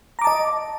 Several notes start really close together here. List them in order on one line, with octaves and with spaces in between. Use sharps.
A#5 D6 A5 D#5